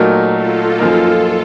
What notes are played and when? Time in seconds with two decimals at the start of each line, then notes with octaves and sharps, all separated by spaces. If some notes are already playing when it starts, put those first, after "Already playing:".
Already playing: A#2 F#3 A3 D#4 A#4
0.33 F4 A4
0.79 F#2 F3 A#3 D#4 A#4